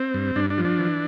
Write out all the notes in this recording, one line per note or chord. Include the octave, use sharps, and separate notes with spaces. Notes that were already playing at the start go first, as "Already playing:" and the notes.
Already playing: C4
G2
G2 D4
D4
F3
D4
E3